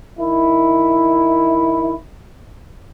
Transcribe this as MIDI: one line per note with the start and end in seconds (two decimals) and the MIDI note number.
0.18 1.91 51
0.18 1.91 64